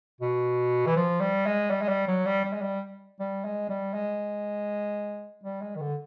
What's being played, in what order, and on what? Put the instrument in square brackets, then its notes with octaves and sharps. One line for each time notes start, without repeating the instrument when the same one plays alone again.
[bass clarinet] B2
E3
F3
G3
G#3
G3
G#3
G3
F#3
G3
G3
G#3
G3
G3
G#3
G3
G#3
G3
G#3
D#3
D3